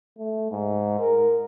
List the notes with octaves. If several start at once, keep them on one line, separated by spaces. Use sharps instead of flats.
A3
G#2
A#4